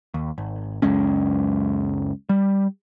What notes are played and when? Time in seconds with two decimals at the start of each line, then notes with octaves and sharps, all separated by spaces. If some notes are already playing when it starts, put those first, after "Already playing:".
0.14 D#2
0.38 G#1
0.82 C#2 F#2 G#3 C#4
2.29 G3